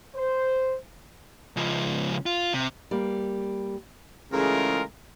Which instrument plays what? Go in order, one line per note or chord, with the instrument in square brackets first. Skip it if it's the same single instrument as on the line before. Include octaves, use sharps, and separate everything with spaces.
[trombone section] C5
[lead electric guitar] C#2 F3
F4
C3
[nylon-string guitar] G3 A#3
[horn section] C#3 E3 G#3 A3 F4 A#4